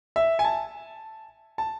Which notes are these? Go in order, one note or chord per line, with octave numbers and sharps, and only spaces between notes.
E5
G#5
A5
A5